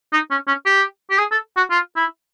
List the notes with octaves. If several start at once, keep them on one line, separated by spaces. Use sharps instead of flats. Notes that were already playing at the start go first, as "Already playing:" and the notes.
D#4
C#4
C#4
G4
G4
G#4
A4
F#4
F4
E4